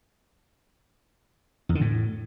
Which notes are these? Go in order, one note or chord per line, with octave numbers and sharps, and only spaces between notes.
E2
D3
A2